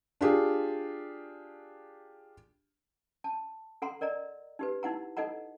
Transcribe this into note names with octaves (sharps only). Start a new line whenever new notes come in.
D4 F4 G4 G#4
A5
A4 F#5 A#5 C6
A#4 D5 D#5 A#5
D#4 G4 B4
D#4 E4 F#5 A#5
D#4 A4 D#5 F#5 A#5